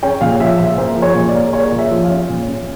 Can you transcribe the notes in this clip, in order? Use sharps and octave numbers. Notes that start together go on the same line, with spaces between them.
C#4 G5
A#2 F5
F3 E5
A#2 E5
A#3 C5
F3
C#5
A#2
D5
A#3
A#3 C#5
A#2
E5
F3
F5
C#4
A#2
C#4